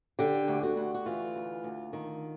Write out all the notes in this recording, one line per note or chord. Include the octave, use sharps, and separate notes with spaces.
D3 G4
D2
F#4
D2
F#4
E3 F4
D2
D2
D#3